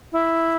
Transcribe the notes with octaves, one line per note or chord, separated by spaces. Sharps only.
E4